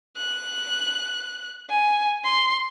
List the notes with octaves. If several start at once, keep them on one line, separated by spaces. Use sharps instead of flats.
F#6
G#5
C6